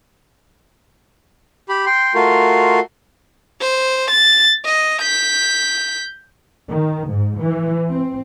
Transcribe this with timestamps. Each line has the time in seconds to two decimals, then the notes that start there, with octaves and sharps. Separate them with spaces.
1.69 G4 B5
1.86 G5 C6
2.15 A3 F4 F#4 A#4 C6
3.61 C5
4.11 A6
4.65 D#5
5.02 G6 B6
6.69 D#3
7.09 G#2
7.41 E3
7.92 C4